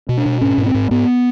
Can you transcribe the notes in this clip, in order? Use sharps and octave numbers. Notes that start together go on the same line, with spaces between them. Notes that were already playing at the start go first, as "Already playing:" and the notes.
B2
D4
B2
G#2 C#4
G#2
C4
G#2
G#2 B3